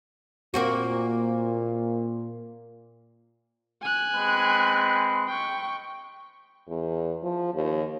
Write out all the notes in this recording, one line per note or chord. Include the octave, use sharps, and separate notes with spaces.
A#2 A#3 C4 F#4
G#5 F#6
G#3 C4 B4
G5 C#6
E2
F3
D#2